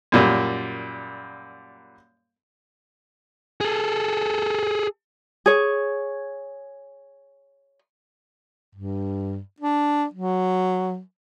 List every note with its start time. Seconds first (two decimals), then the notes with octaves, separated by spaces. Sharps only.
0.12 F#2 A#2 G3
3.61 G#4 A4
5.46 G#4 C#5
8.75 G2
9.60 D4
10.14 F#3